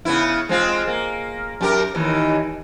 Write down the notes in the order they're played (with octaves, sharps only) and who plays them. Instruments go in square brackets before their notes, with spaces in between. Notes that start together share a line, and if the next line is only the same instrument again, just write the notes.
[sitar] C#3 B3 E4
G#3 C4 F4
A#3
F#2 G4 A#4
D#2 D#3 E3